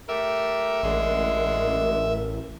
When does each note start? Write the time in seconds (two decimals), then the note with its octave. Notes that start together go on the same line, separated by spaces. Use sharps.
0.09 A3 G4 A#4 E5
0.83 A1 F#2 D3 G#3 A#4